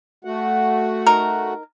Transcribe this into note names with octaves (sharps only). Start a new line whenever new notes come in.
A3 F#4 F#5
D#4 A#4